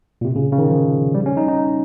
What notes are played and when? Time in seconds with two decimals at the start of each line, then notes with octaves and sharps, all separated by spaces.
0.21 A#2
0.25 C3
0.36 C#3
0.52 C#3
0.58 D#3
0.70 F3
1.15 G3
1.26 C#4
1.37 D#4
1.48 D#4